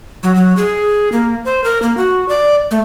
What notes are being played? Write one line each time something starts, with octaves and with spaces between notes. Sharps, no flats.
F#3
F#3
G#4
A#3
C5
A#4
A#3
F#4
D5
A3